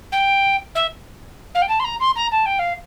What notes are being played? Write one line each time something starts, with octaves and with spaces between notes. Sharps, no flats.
G5
E5
F5
G5
A5
C6
A#5
C6
A#5
A5
G5
F5